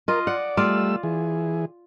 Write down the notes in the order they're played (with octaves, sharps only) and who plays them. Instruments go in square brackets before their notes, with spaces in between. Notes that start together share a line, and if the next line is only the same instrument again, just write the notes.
[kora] F4 D#5 [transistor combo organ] A#4
[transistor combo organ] D5 [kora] F#5
[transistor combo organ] G3 A3 E6 [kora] F4 D5 F5
[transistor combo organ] E3 G#4